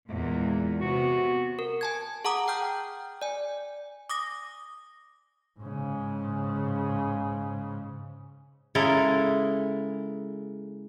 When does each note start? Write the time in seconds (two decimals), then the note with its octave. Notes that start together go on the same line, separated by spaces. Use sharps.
0.10 E2 A#2 G#3
0.81 C3 B3 F#4
1.59 A#4
1.81 G#5 A5 G#6
2.25 G#4 F#5 A5 A#5 D6 D#6
2.48 G5 F6 G6
3.22 D5 G#5
4.10 D6 D#6 A#6
5.59 G#2 C#3
8.75 C#3 G#3 E4 A4 A#4